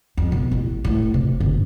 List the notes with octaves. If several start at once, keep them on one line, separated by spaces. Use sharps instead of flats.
F2
B2
A1
A2
C3
G1